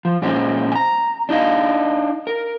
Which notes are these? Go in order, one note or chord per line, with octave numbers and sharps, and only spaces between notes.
F3
A#2 G#3 C4 C#4
G#5 A#5
D4 D#4 D#5 F5
A#4